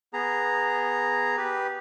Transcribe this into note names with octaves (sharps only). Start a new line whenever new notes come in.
B3 G#4 A#5
G4 B4